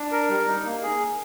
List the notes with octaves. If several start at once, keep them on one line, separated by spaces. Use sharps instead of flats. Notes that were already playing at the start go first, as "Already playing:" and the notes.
Already playing: D4
A#4
G3
D#4
A#3
G#4